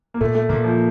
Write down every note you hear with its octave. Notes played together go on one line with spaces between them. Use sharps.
A#3
A#2 A3
A3
A#2 A#3
F3